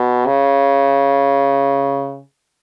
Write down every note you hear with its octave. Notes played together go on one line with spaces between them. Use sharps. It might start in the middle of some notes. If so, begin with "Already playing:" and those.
Already playing: B2
C#3